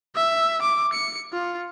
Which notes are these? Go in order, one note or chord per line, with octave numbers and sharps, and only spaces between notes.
E5
D6
C#7
F4